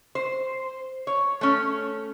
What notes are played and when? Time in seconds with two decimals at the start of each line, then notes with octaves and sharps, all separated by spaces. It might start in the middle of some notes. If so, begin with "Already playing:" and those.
0.15 C5
1.07 C#5
1.41 A3 C#4